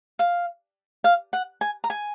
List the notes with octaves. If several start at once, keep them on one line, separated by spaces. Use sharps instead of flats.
F5
F5
F#5
G#5
A#5
G#5